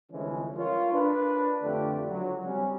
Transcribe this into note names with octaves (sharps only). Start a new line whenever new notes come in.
C2 D3 E3 F3 G#3 C#4
F4 A#4 C#5
D4 B4
F2 D3 A3 F4 G4 D5
C#2 D3 F#3
G3 C4 C#4